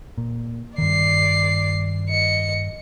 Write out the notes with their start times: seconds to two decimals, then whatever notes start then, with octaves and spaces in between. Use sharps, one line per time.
0.18 A#2
0.78 G2 D#3 D5 C7
2.09 D#5 C#7